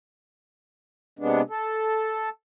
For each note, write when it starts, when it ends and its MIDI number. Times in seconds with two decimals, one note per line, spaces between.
1.19 1.42 48
1.19 1.42 56
1.19 1.42 59
1.19 1.42 62
1.50 2.29 69